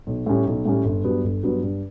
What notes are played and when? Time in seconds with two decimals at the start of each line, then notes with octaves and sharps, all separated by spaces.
0.07 B1
0.26 A2 G3 C#4 G4
0.46 B1
0.65 A2 G3 C#4 G4
0.85 G1
1.04 G2 F#3 B3
1.24 G1
1.43 G2 F#3 B3
1.63 G2